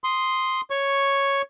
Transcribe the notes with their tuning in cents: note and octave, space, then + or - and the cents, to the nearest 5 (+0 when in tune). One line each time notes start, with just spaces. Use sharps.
C6 +0 D#6 +0
C#5 +0 C#6 +0